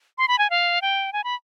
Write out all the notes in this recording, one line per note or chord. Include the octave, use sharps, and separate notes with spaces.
C6
B5
G#5
F5
G5
G#5
B5